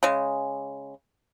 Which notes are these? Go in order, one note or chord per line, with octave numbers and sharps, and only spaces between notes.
C#3 G#3